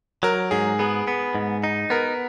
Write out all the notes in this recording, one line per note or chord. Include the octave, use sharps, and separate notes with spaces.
F#3 A#4
G#2 G#4
B3 G#4
B3
G#2
D#4
B3 A#4